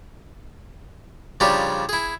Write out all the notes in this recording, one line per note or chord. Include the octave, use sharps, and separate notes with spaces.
C#3 F3 G3 D4 D#4 G4
E4 G#4